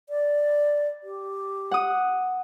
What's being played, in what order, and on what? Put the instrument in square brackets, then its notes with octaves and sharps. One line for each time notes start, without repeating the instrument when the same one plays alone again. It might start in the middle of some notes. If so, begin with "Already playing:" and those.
[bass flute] D5
G4
[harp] F#5 D#6